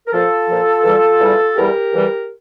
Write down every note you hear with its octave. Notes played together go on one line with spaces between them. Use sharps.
A#4
A#2 F3 F4 A4
A#2 F3
E2 E3 G3
E2 E3 G3
E2 E3 G3 G4 A#4
E2 E3 G3